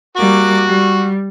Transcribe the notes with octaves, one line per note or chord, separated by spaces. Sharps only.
G3 A#3 F#4 D6
G3